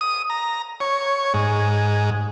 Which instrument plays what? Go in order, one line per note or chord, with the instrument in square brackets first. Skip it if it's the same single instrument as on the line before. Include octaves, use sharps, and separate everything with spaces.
[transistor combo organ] D#6
A#5
C#5
G#2